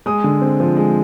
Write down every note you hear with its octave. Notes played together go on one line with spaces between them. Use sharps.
G#3 D#6
D3
C4
F3
G#3